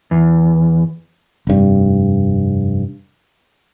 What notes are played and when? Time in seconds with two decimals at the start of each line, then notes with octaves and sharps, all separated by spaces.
0.11 E2
1.47 F1 G2